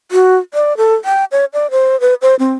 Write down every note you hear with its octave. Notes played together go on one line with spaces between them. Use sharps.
F#4
D5
A4
G5
C#5
D5
C5
B4
C5
C4